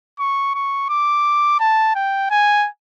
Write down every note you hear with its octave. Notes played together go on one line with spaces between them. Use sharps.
C#6
C#6
D6
A5
G5
G#5